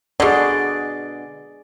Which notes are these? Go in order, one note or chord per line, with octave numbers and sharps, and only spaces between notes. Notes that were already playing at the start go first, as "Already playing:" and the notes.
B2 D3 G#4 D5